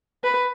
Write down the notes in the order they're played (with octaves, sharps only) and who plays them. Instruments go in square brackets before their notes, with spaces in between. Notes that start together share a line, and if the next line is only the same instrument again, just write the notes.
[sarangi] B4